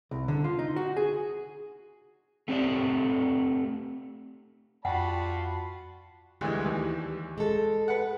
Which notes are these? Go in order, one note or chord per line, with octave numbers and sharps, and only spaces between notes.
C2
D3
F4
D#4
F#4
G#4
A3 C4 G4 A4 D5
F2 F4 F#4 D5 F#5 G5 A5 B5
D2 E3 G3 G#3
D#2 E3
G#3 A4
B4 F#5